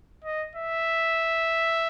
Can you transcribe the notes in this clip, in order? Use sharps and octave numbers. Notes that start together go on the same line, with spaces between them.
D#5
E5